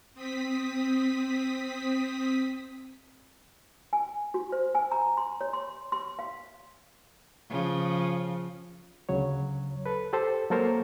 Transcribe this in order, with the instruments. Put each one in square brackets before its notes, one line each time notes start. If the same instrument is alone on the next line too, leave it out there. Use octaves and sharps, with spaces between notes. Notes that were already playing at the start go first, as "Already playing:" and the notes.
[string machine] C4 D#6 B6
[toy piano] G#5
F#4
C5
G#5
A#5
C6
C#5
C6
C6
F5
[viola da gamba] C#3 F3
[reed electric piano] D2 C#3 F#3 C#5
A4 B4
G4 A4 C5
F#3 A#3 A4 A#4 C5 C#5